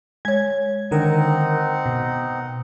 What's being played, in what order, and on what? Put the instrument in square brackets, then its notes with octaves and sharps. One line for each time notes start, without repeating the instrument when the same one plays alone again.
[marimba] G#3 C#5 [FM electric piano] G#6
[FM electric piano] D3 D#3 A#4 [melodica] C4 D#4 F#5
[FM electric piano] B2